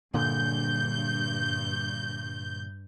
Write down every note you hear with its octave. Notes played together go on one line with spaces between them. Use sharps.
G2 A#2 D3 G6